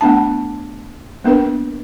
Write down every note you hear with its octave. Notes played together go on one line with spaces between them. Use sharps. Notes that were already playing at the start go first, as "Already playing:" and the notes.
A3 B3 D4 A5
A#3 B3 D4 A#4 B4